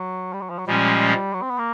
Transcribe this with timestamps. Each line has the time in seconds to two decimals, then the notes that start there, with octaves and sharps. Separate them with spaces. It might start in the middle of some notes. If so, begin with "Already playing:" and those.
Already playing: F#3
0.33 G3
0.41 F#3
0.50 F3
0.58 F#3
0.67 A#2 F3 G3 G#3 C#4
1.33 F#3
1.42 C4
1.50 B3
1.58 A#3